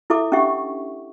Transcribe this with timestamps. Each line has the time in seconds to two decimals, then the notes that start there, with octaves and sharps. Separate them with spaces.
0.10 E4 A4 E5 D6
0.32 C#4 D4 G4 E5 F#5 C#6